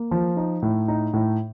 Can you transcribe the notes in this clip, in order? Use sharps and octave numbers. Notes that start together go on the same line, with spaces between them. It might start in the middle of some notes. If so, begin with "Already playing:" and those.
Already playing: A#3
F3
D#4
A2
D#4
A2